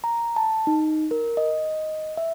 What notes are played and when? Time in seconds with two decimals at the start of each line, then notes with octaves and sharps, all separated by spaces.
0.04 A#5
0.36 A5
0.67 D#4
1.11 A#4
1.37 D#5
2.17 E5